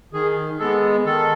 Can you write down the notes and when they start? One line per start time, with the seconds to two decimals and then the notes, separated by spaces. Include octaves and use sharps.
0.13 D#3 G#4
0.59 G#3 B3 A4
1.05 D#3 A4